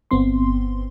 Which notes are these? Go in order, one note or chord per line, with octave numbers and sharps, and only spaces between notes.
G1 B3 C4 C6